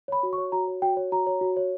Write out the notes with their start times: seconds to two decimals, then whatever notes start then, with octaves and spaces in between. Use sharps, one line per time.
0.08 C#5 B5
0.23 F#4
0.33 C#6
0.38 C#5
0.52 F#4 A#5
0.68 C#5
0.82 F#4 G5
0.97 C#5
1.12 F#4 A#5
1.27 C#5
1.41 F#4
1.57 C#5